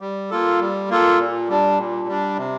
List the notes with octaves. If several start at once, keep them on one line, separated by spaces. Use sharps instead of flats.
G3
A#3 F4 A4
G3
A#3 F4 A4
A#2
G3 D4
A#2
G3 D4
C3